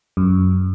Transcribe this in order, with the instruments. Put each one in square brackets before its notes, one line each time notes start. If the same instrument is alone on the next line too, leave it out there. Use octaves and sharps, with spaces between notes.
[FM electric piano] F#2